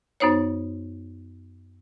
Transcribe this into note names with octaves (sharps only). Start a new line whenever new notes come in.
F#2 B3 D#4 C5 C#5